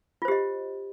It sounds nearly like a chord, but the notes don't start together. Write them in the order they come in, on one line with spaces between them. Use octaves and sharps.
F4 C5 G4 D#5